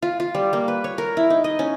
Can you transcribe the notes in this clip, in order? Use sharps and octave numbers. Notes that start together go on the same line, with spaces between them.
F4
F4
G3
A#3
B4
C#5
A#4
E4
D#4
D#5
C#4